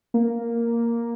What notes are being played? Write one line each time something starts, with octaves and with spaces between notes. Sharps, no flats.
A#3